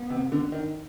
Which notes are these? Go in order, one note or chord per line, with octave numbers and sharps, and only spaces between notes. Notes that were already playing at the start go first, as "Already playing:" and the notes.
Already playing: B3
C3
D3
D#3